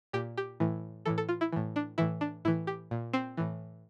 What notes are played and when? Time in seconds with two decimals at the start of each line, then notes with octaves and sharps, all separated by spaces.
0.13 A#2 G4
0.37 G4
0.60 A2 E3
1.05 A2 E3 A4
1.18 A4
1.29 F4
1.41 E4
1.53 A2 E3
1.76 D4
1.98 A2 E3 E4
2.21 D4
2.45 A2 E3 E4
2.67 G4
2.91 A#2
3.13 C4
3.37 A2 E3